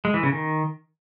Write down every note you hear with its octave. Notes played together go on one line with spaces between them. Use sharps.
G#3
E3
C#3
D#3